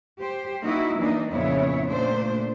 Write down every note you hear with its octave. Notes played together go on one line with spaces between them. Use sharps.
G4 C5
A#3 D#4 E4 F#4
E3 A#3 D4 D#4
F2 A#2 C#3 B3 E4 C#5
A#2 A3 D4 C5